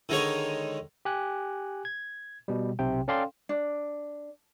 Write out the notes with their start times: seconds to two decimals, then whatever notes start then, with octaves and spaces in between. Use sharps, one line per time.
0.09 D3 D#3 G#3 D#4 C#5
1.05 G4 G#5 F#6
1.85 G#6
2.48 B2 G3
2.79 B1 C3 G5
3.08 C#4 A4 D5 F5 G5 C6
3.49 D4